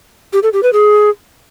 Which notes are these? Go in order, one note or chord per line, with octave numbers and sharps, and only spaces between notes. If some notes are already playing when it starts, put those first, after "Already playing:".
G4
A4
G4
B4
G#4